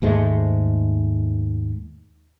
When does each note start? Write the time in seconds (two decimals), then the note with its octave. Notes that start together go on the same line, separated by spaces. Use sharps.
0.02 D#2 G#2 G#3 A3